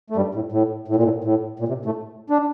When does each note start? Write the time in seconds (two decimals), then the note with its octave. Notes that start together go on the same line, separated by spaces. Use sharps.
0.10 A3
0.16 G2 G3
0.35 A2
0.52 A2
0.88 A2
0.96 A#2
1.03 A2
1.24 A2
1.60 A#2
1.68 C3
1.85 A2 A3
2.30 D4